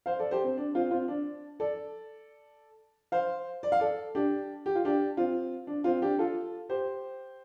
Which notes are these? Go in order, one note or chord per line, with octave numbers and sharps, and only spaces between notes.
C5 F5
A4 D5
G4 C5
C4
D4
C4 F4
C4 F4
D4
A4 D5
C5 F5
D5
F5
A4 D5
D4 G4
G4
F4
D4 G4
C4 F4
D4
C4 F4
D4 G4
F4 A4
G4 C5